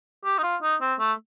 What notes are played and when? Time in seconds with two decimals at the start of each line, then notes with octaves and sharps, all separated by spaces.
0.25 G4
0.38 D#4
0.43 F4
0.62 D#4
0.81 C4
0.99 A3